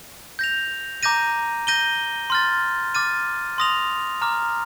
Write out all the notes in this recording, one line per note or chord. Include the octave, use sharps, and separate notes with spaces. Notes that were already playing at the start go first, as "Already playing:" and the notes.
G6 A#6 F7
A#5 D6 G6 A#6 D#7
G6 A#6 D#7 G7
C6 F6 A6
D6 F6 A6 D#7
C6 D#6 A#6 F7
A#5 D6 F6